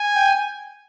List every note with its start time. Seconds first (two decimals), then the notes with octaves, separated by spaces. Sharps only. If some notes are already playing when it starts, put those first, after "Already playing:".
Already playing: G#5
0.15 G5